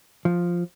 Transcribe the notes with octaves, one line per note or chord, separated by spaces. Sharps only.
F3